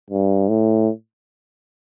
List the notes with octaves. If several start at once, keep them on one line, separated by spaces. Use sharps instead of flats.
G2
A2